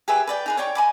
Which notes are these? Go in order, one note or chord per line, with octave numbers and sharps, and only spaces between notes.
G4 G#4 B4 E5
B4 D5 G5
D#4 G#4 B4
C#5 D5 G5 C#6
D#5 G#5 B5 D6